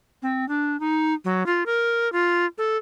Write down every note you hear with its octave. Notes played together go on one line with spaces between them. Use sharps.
C4
D4
D#4
F#3
F4
A#4
F4
A4